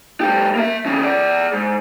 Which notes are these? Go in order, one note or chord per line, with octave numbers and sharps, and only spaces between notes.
G#2 G4
A#3 E5
D#3 C#4
G#4 D5
G#2